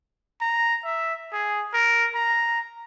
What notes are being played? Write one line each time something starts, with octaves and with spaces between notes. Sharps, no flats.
A#5
E5
G#4
A#4
A#5